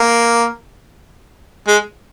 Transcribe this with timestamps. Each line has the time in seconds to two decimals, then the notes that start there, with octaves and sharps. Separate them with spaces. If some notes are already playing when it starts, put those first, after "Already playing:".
Already playing: A#3
1.68 G#3